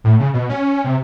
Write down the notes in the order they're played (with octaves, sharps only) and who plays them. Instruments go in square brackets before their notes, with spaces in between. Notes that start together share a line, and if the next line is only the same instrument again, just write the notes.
[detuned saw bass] A2
C#3
B2
C#4
C3